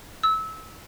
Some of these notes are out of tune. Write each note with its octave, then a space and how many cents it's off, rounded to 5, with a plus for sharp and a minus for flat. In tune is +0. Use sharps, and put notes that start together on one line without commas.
E6 -25